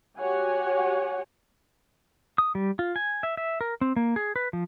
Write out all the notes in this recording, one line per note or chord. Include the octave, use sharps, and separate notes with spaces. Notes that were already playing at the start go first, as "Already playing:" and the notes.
F#4 G4 C#5 F#5 G#5
D#6
G3
F4
G#5
E5
E5
A#4
C4
A#3
G#4
B4
F3